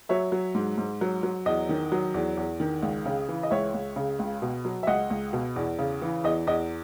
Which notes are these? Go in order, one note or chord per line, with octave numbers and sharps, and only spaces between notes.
F#3 C#5 E5
F#3
G#2
G#2
F#3
F#3
E2 D#5
D#3
F#3
E2
E2
D#3
C#2
C#3
E3
D#5
C#2 C#5 E5
C#2
C#3
C#2
B2
F#3
E5
C#2 D#5 F#5
C#2
B2
E2
C#3
E3
E2 D#5
E2 D#5